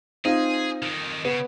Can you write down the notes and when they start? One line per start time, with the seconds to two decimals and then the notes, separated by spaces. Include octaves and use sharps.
0.25 C4 D#4 F4 G#4
0.83 F2 D#3
1.25 C#3 B3